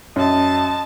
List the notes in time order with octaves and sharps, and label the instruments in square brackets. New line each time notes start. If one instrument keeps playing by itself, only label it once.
[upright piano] F#2 [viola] D#5 A5